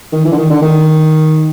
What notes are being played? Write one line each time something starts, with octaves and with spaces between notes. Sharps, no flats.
D#3
E3
D3
D#3
D3
D#3